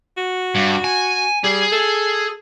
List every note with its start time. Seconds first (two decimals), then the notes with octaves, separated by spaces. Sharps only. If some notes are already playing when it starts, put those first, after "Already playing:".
0.17 F#4
0.55 G2
0.84 G#5
1.44 G3 G#4
1.72 A4